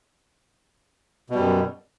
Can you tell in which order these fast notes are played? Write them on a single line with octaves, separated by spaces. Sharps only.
B2 G3 F#2